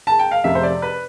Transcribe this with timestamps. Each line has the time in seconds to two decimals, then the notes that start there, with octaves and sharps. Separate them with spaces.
0.07 A5
0.19 G5
0.31 F5
0.44 F1 F2 C3 E5
0.55 C5
0.63 D5
0.82 B4